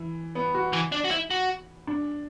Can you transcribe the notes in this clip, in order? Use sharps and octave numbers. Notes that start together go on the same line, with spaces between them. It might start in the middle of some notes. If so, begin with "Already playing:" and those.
Already playing: E3
B3
F#4
E3
D4
F#4
E4
F#4
D4